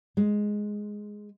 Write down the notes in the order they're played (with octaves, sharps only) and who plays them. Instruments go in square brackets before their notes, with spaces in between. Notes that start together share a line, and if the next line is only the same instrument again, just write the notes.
[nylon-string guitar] G#3